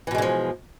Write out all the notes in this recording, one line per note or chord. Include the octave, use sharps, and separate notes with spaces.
B2 D3 E3 F3 G#3